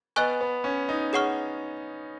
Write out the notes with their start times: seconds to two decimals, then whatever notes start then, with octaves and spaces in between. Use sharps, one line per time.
0.16 B3 B4 D#5 G#5 C#6 F#6
0.41 B3
0.64 C#4
0.89 D#4
1.13 G#4 C#5 F#5 C#6 F6